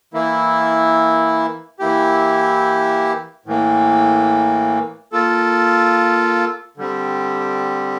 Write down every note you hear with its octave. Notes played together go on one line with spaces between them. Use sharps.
E3 A#3 E4
E3 A#3 E4 G4
A2 E3 A#3
A#3 F4 A4
D3 G3 C4